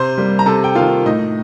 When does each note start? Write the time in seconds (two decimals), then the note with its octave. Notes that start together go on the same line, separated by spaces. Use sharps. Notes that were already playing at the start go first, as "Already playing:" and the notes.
Already playing: C3 C5 C6
0.18 G3 A#3
0.39 A#5
0.46 C3 A4 A5
0.64 G5
0.75 D#3 A#3 F4 F5
1.06 A2 D#4 D#5